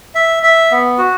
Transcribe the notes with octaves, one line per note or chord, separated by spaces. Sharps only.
E5
E5
B3
F#4